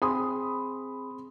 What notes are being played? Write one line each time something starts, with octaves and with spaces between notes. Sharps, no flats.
C4 G#4 B5 C6 D#6